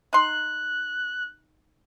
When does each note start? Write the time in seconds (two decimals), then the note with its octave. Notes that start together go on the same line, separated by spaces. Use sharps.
0.13 D#4 C6 F#6